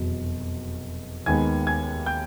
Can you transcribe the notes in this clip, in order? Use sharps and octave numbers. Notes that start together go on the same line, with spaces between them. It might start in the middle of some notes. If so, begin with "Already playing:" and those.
Already playing: F1 E2 B2 F#3
D#2 D#3 G#3 B3 G#5 G#6
G#5 G#6
G5 G6